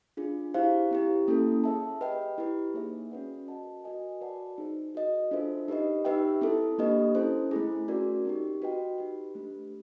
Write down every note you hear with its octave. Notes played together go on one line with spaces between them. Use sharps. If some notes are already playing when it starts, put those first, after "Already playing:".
D4 F4 G#4
E4 G4 C5 F5
C4 E4 G4
A#3 C#4 E4 A4
G#4 C#5 E5 A5
G4 B4 D#5 G5
E4 G4 B4
A#3 D#4 G#4 C#5 E5
C#4 F#4 B4 D5 F#5
F#4 A#4 D#5 F#5 A5
F#4 A#4 D#5 G#5
F#4 B4 D5 F#5 A5
D#4 G#4 C5
F#4 A#4 D#5
D4 F4 A4 C5 E5
D#4 G4 B4 D#5
D#4 G4 B4 E5 G5
C4 E4 A4
A#3 D4 G4 B4 D#5
C#4 E4 A4 C5
A3 C4 E4 G#4
C#4 F#4 A#4 D5
C4 D#4 G4
F#4 B4 D#5 G5
D#4 G4 B4
A3 D4 G4 B4